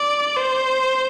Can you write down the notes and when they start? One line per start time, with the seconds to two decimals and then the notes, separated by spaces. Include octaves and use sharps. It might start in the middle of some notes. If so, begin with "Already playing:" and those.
Already playing: D5
0.36 C5